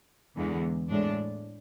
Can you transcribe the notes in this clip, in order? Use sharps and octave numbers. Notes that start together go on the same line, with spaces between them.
E2 D3 G#3
A2 G#3 D4